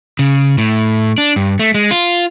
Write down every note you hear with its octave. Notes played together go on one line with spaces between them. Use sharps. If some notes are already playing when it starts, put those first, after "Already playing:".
C#3
A2
D4
G2
A3
G#3
F4